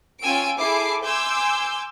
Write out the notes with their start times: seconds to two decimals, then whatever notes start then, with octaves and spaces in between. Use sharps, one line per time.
0.23 C#4 F4 G5 G#5 E6 D7
0.57 E4 G#4 A4 D6 C7
1.02 G#5 C6 D6 E6 G6